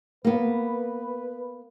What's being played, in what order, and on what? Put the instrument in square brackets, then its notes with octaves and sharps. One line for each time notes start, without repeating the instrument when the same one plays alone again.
[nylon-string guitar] A#3 B3 [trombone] B4